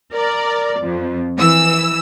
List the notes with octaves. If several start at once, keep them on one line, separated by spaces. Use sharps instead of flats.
A#4 D5
F2
E3 E6